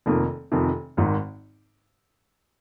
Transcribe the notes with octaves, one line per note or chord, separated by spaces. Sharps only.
F1 F2 D#3 A#3
F1 F2 C3 D#3
G#1 G#2 D#3